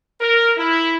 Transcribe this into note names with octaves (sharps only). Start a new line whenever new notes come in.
A#4
E4